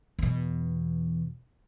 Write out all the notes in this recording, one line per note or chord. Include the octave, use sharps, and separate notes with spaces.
E2 B2